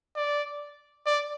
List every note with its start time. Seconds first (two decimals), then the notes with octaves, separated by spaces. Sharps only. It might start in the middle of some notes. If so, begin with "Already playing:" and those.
0.16 D5
1.06 D5